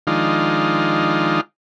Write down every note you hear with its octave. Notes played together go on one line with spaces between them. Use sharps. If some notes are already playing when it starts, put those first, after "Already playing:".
D#3 F3 G#3 D4 D#4 F4